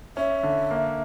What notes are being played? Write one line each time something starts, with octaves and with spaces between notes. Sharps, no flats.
C#4 E5
D3
A#3